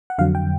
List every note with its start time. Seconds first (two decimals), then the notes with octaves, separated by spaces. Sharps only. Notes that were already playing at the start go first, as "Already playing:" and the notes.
0.10 F#5
0.18 F2 D3 F#3 F5
0.35 G5